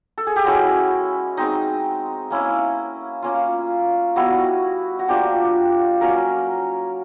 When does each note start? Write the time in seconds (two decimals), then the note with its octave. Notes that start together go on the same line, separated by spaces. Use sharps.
0.18 A4
0.27 G#4
0.36 G4
0.45 G#3 C#4 E4 F#4
1.37 G#3 C4 D#4
2.31 A#3 C#4 E4
3.22 A#3 C#4 F4
4.16 G3 B3 E4 F#4
4.99 F#4
5.08 F3 A#3 D4 F4 G4
6.01 F#3 A#3 C#4 A#4